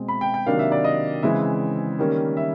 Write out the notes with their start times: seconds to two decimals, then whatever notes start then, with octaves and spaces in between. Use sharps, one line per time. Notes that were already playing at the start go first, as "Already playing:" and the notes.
Already playing: B2 G#3 C4
0.08 B5
0.21 G5
0.34 G5
0.46 C3 D#3 F#3 A#3 D4 F5
0.59 E5
0.72 D5
0.84 D#5
1.22 C#3 E3 G#3 C4 E5
1.99 D#3 G3 A#3 C#4
2.37 E5